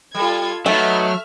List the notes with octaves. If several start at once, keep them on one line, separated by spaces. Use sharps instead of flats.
G3 F4 A4 G#6
F#3 A3 B3 D#4 E5 F6